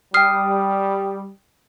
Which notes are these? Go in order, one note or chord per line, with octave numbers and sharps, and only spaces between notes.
G3 G5 D#6 F6 C7